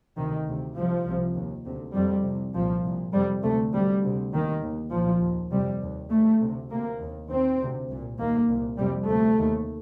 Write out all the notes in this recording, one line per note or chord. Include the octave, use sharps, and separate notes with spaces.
D2 C3 D#3
D2 C3
C2 C3 F3
C2 C3
D#2
D2 C3
F2 C3 G3
C2 C3
C2 A#2 F3
C2 A#2
F2 C3 G3
D2 C3 A3
D2 C3 G3
D2 C3
D#2 D#3
D#2
C2 A#2 F3
D#2
F2 C3 G3
D#2
D#2 A3
D2 C3
D2 C3 A#3
D#2
D#2 C4
D2 C3
C2 A#2
D#2 A#3
C2 A#2
F2 C3 G3
D2 C3 A3
D#2